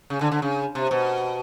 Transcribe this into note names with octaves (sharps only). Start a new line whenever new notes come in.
C#3
D3
D3
C#3
C3
B2